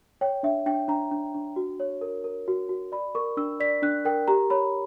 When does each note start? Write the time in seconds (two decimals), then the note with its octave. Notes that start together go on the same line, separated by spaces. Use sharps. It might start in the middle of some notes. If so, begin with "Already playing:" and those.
0.21 C#5 G5
0.43 D4 E5
0.66 D4 G5
0.88 D4 A#5
1.11 D4
1.34 D4
1.56 F#4
1.80 C#5
2.01 A#4
2.24 A#4
2.48 F#4
2.69 F#4
2.92 D5 B5
3.15 A#4 C#6
3.37 D4 E6
3.60 D5 B6
3.82 D4 F#6
4.05 A#4 G5
4.28 G4 A#5
4.50 C#5 B5